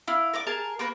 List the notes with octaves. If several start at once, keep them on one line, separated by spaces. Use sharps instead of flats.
E4 F5
A#4 D5 D6
G#4 A#4 A5
A#3 A#4 B4